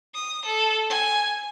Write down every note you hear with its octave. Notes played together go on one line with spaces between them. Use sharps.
D#6
A4
G#5